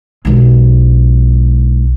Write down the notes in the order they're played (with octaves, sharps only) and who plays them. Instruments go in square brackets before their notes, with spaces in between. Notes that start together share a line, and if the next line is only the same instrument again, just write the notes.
[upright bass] B1 G#3